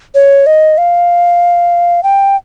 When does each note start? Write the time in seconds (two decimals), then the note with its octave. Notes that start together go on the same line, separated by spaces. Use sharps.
0.15 C#5
0.46 D#5
0.78 F5
2.03 G5